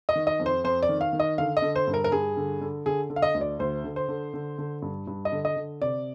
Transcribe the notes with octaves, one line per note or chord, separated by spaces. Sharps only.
D#5
D#3
D#5
F2
C5
F2 C5
D5
D#3
F5
D#3
D#5
D3 F5
D#5
D3
C5
G2
A#4
A#4
G2 G#4
D3
D3
D3 G#4
D3
F5
D#5
D2
D5
D2 C5
D3
C5
D3
D3
D3
G2
G2
D#5
D3
D#5
D3
C3 D5